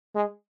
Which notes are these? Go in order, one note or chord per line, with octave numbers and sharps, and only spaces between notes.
G#3